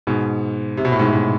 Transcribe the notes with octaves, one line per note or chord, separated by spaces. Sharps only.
G#2 B2
C3
B2
A2
G#2 B2
G#2